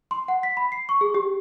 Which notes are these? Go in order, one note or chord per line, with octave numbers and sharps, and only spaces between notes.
C6
F#5
B6
B5
C7
C#6
G#4
G4